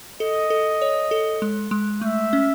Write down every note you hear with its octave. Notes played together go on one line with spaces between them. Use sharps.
A4 D#5
A4
C#5
A4
G#3
G#3
A3 E5
C#4